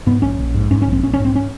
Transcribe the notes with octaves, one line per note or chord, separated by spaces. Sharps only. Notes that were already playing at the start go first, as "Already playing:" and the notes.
G#2 B3
A#1 C#4
A#1
G#2
G#2 C#4
C#4
A#1
C4
A#1 C#4
C#4
G#2
C4
C#4